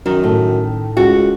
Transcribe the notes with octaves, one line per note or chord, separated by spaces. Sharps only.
F#2 D#3
A2
C#2 F#4